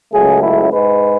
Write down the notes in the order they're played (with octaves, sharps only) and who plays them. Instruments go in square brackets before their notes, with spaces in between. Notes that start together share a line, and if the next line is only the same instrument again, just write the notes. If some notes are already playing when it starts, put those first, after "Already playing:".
[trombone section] C#2 C#3 F#3 A3 G#4
E4
G#2 G#3 B4